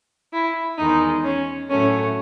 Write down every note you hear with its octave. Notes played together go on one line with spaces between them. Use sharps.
E4
E2 D#3 G#3 D#4
C#4
A2 F#3 A3 C#4